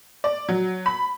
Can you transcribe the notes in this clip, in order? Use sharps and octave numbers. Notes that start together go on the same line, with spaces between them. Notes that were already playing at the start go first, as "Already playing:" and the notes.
D5
F#3
B5